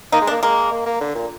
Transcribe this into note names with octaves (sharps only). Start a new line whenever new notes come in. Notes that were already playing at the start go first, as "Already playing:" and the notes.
A#3 D#4
G#3
D4
A#3
G#3 A#3
A#3
A#3
D3
A#2